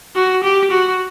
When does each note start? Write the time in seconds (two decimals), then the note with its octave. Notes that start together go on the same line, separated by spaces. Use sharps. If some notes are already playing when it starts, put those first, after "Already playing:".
0.15 F#4
0.43 G4
0.71 F#4